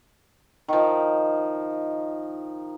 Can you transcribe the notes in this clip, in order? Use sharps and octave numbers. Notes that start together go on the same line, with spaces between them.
D#3 F3